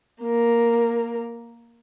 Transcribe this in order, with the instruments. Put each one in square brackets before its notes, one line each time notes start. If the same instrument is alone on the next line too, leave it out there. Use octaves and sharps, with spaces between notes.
[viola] A#3 A#4